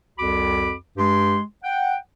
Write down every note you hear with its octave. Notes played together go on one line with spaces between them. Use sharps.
C2 F2 F#4 B5 D6
G2 G#3 G4 C6
F#5 G5